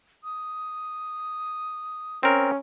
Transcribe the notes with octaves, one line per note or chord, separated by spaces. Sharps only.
D#6
C4 C#4 A#4